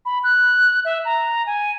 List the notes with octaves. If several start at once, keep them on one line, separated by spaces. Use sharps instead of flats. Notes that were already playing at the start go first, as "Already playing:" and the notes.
B5
F#6
E5
A#5
G#5